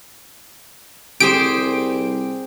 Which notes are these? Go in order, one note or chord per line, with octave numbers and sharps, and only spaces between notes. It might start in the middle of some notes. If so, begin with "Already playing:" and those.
C2 G4 G#4 C5 D7